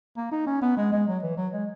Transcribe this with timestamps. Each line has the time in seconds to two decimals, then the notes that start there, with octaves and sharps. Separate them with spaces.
0.17 A#3
0.32 D#4
0.46 C#4
0.62 B3
0.77 G#3
0.92 G#3
1.07 F#3
1.23 E3
1.37 F#3
1.53 G#3